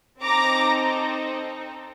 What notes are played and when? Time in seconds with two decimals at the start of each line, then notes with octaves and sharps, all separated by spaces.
0.21 C4 D#4 A4 A#5 D6